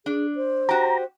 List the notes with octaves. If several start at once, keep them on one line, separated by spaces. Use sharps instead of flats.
D4 G#4
C5
F#4 G4 A#5